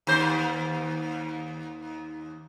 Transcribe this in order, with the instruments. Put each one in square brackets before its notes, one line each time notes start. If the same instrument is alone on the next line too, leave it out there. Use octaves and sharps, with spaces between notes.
[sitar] D#2 C5